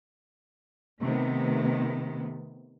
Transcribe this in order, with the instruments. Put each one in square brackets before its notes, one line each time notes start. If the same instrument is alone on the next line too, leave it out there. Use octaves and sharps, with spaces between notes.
[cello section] C3 D#3 A3 B3